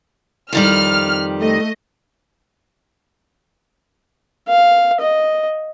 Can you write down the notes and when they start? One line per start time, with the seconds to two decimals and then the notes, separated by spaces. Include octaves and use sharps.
0.53 F2 D#3 G3 F6
1.38 A3 D#5
4.48 F5
5.01 D#5